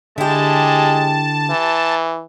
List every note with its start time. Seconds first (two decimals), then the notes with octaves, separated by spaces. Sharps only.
0.18 D3 G#3 E4 G4 A5
1.50 E3